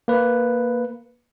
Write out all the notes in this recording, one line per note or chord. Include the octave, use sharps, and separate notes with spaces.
A#3 B4